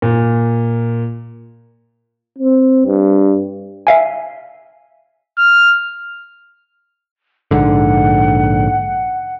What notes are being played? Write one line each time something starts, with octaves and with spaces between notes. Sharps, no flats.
A#2
C4
G2
E5 F5 G#5
F6
A#1 G#2 D3 F#5